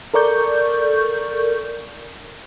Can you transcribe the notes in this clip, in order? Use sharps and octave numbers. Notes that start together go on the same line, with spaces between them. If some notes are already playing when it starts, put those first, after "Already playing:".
A4 A#4 D5 C#6 G6